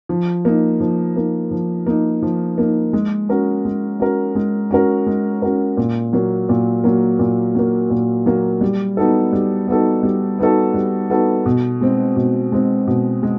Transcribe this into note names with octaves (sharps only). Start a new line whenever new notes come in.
F3
A#3 D#4
F3
A#3 D#4
F3
A#3 D#4
F3
A#3 D#4
G#3
C#4 F#4 A#4
G#3
C#4 F#4 A#4
G#3
C#4 F#4 A#4
G#3
C#4 F#4 A#4
A#2
F#3 A#3
A#2
F#3 A#3
A#2
F#3 A#3
A#2
F#3 A#3
G3
B3 D#4 F#4 A4
G3
B3 D#4 F#4 A4
G3
B3 D#4 F#4 A4
G3
B3 D#4 F#4 A4
B2
G#3 C4
B2
G#3 C4
B2
G#3